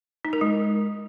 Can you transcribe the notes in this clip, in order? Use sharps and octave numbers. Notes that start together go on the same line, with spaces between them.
D#4
A#4
G#3